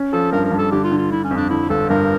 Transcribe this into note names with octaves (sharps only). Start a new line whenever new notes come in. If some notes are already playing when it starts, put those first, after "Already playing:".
Already playing: C#4
F3 A4
G2 A#4
A#4
G2
A4
D3 G4
F4
D3
F4
D3 E4
C#4
F2
D4
D3 E4
G1 A4
G2 A#4